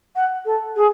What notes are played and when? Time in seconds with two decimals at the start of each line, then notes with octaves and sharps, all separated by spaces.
0.15 F#5
0.45 A4
0.76 G#4